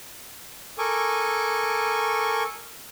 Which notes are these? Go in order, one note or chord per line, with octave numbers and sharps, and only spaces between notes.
A4 A#4 G#5 C#6 D6